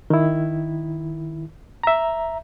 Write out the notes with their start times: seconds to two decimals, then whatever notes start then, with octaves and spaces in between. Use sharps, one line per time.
0.10 D#3 E4
1.83 E5 A#5